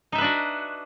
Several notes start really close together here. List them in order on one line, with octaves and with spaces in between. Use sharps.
D#4 E5 B4 D4 F#4